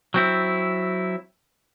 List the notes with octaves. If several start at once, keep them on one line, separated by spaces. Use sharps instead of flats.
F#3 C4 E4